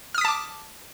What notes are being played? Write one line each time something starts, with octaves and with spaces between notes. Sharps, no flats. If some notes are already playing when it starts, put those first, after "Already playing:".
A5 D6 D#6 F6 B6